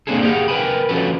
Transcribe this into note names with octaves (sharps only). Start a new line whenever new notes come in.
A#3 C4 D4 E4 G#4 A4
G4 G#4 B4 F5 F#5
A#4 B4 G5 G#5 B5
F3 C#4 F#4 A4 B4